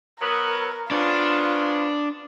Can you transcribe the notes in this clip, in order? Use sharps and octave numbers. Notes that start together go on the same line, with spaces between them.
F#3 B3 A#4
C#3 F3 B3 D4 F4